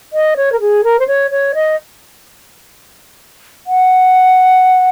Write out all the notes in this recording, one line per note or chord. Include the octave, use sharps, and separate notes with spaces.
D#5
C#5
A#4
G#4
A#4
C5
C#5
C#5
D#5
F#5